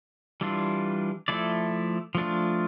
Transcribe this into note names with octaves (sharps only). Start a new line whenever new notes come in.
E3 G3 D4 F4
F3 A3 E4 A4 D5
F3 A3 D4 F4